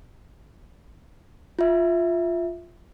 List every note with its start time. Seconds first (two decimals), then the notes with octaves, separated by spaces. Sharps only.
1.59 F4 E5